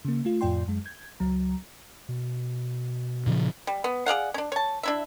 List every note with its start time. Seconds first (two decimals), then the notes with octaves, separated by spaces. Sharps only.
0.05 C#3 A#3
0.25 A3 F4
0.41 F2 A2 F4 D5 G5 C6
0.68 F#2 G#3
0.85 G6 G#6
1.20 C#2 F#3 A#5
2.09 B2
3.26 A#2 C#3 F3
3.67 G3
3.84 B3
4.06 G#4 D5 F5 F#5
4.34 C#4 D4
4.52 C#5 A5
4.83 D4 E4 E5